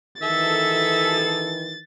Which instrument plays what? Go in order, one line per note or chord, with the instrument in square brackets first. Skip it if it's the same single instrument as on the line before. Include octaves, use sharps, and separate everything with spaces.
[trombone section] D#3 E3 [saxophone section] G#4 A4 [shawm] E5 [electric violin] A6